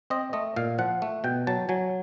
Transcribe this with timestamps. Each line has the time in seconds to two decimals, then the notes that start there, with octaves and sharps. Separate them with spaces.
0.10 C4 D#5
0.33 A3 D#5
0.56 A#2 F5
0.78 F3 F#5
1.02 A3
1.24 B2 G5
1.47 F#3 A5
1.69 F#3 G#5